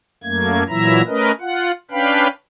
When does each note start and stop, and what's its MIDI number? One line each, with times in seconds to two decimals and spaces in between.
0.24 0.63 42
0.24 0.63 57
0.24 0.63 58
0.24 0.63 92
0.69 1.02 46
0.69 1.02 52
0.69 1.02 54
0.69 1.02 64
0.69 1.02 76
0.69 1.02 82
1.07 1.32 57
1.07 1.32 61
1.07 1.32 70
1.07 1.32 71
1.07 1.32 75
1.40 1.72 65
1.40 1.72 78
1.91 2.28 61
1.91 2.28 62
1.91 2.28 71
1.91 2.28 77
1.91 2.28 79
1.91 2.28 83